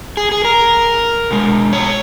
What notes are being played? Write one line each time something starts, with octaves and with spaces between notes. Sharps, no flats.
G#4
G#4
A#4
B2 G#3
C#5